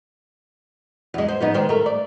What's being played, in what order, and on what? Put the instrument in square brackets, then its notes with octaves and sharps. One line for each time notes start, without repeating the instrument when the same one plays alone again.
[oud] E2 G#3
C5
F3 B3 D#4
D#3 G#3 C5
A3 A#4
D5